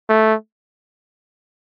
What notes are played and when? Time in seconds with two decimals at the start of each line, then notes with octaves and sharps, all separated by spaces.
0.09 A3